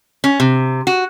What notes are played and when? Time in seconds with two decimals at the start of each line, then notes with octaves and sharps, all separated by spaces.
0.24 C#4
0.40 C3
0.87 F#4